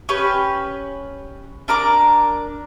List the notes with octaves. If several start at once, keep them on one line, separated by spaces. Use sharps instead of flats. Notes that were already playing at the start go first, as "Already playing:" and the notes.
C#4 G4 B4
D4 A#4 A#5 D6